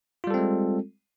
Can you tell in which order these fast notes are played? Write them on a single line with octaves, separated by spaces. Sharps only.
F4 G3 A4 C4 G#3